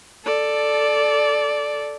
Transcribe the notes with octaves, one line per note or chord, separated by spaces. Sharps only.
A4 D5